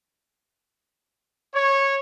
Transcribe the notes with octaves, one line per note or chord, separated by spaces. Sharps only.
C#5